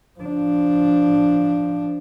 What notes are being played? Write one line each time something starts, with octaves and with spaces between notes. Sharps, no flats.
F3 D4